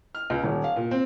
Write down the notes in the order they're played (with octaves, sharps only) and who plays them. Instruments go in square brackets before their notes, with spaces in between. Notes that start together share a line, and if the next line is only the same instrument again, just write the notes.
[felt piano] F6
C#2
D#1
F5
A#2
C4